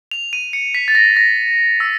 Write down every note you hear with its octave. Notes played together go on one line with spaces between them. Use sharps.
F7
D#7
C#7
B6
A6
A#6
A#6
E6